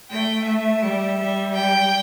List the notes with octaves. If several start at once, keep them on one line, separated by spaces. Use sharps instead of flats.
A3 G5
E5
G3
G3
G5